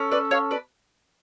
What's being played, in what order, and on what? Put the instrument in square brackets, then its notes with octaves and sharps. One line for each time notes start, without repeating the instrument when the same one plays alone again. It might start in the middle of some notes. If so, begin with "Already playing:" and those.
Already playing: [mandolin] C#4 A4
B4 D5
C#5 F5
B4 D5